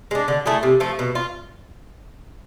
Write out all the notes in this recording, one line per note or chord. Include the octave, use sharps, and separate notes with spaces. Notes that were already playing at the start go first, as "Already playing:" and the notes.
G#3 D4
D3
A3 E4 G#4
C3
F3 A3
B2
F4